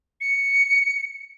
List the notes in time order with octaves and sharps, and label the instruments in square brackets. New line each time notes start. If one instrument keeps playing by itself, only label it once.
[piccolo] C#7